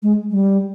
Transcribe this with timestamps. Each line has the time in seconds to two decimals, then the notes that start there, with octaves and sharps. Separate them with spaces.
0.03 G#3
0.31 G3